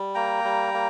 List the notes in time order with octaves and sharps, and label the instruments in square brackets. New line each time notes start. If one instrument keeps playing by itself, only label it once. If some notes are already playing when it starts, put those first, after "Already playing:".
Already playing: [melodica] G3
A#3 G5 A#5
G3
A#3